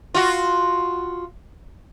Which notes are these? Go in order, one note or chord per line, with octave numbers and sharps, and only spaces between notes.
F4 F#4